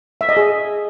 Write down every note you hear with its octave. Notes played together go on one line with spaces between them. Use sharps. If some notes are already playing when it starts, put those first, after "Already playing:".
E5
D#5
G#4